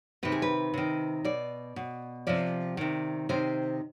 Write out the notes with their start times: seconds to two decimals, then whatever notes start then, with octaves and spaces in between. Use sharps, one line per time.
0.23 C3 D#3 B4
0.32 G#4
0.42 B4
0.74 C3 D#3
1.25 B2 D5
1.76 B2
2.27 C3 F3 D5
2.77 C3 D#3
3.29 C3 D#3 C5